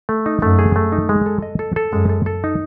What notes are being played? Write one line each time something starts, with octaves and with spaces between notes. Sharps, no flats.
A3
D#4
F#2 A3
G#4
A3
D#4
G#3
A4
D#5
A4
A4
F#2 G#3
A4
A4
D#4